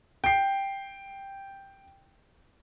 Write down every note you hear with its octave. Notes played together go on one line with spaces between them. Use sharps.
G5 C7